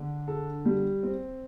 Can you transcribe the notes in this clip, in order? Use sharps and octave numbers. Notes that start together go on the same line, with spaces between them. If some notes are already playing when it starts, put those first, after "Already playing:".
Already playing: D3 D4
A4
G3
C4